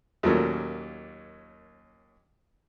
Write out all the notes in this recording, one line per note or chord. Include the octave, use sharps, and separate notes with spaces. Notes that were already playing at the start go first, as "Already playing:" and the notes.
D#2 A#2 F#3 A3 A#3 C#4